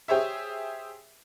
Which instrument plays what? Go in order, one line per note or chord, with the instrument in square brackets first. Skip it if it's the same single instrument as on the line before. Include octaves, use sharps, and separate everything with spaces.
[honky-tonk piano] G4 G#4 C5 C#5 E5